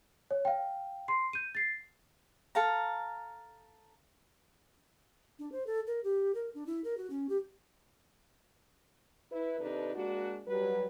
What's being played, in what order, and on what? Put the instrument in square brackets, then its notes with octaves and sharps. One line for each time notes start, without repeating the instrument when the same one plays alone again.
[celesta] C#5
F5 G5
C6 C7
G6 D#7
A6 C7
[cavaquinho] A4 F5 A#5
[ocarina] D4
C5
A4
A#4
G4
A#4
D4
E4
A#4
F#4
C#4
G4
[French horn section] E4 B4
C3 D#3 D4 D#4 A4 B4
G#3 A#3 D4 F#4
F#3 G3 B4